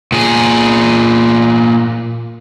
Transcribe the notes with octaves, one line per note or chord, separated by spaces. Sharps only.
A#2 G#4